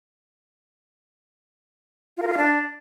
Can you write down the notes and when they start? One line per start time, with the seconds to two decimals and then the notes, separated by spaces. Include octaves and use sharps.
2.17 F4
2.22 A#4
2.27 F4
2.32 F5
2.37 D4